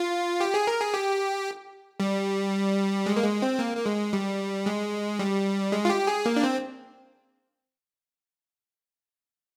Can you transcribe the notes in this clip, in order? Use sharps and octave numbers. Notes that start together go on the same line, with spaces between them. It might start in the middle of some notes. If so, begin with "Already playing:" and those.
Already playing: F4
G4
G#4
A#4
G#4
G4
G3
G#3
A#3
G#3
C4
A#3
A#3
G#3
G3
G#3
G3
G#3
F4
G4
G#4
A#3
D4
C4